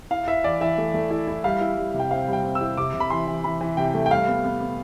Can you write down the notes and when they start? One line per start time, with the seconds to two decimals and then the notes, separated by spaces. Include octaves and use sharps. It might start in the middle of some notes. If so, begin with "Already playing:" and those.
0.11 E4 F5
0.28 E4 E5
0.44 E3 D5
0.61 E3 E5
0.78 A3
0.94 A3
1.11 E4
1.27 E4
1.44 G3 F5
1.61 E4
1.77 G3
1.94 C3
1.99 G5
2.11 C4 F5
2.28 G3 G5
2.44 C4
2.55 E6
2.61 E4
2.77 C3 D6
2.94 C3
3.00 B5
3.10 E3 C6
3.27 E3
3.44 E3 B5
3.61 E3
3.77 C3 G5
3.94 A3
4.06 G5
4.10 G3 F5
4.27 B3
4.45 B3
4.61 B3